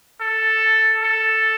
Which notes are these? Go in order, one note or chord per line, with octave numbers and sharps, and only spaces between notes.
A4
A4